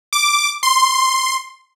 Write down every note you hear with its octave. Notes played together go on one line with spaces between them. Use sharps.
D6
C6